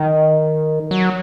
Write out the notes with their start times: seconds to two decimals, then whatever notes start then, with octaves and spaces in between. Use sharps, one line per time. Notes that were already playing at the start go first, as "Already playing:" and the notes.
Already playing: D#3
0.91 F#3